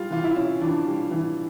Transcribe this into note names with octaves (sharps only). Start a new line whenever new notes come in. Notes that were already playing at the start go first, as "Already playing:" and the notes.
Already playing: G3 F4
E3 F4
E4
C#4
E3 D4
G3
E3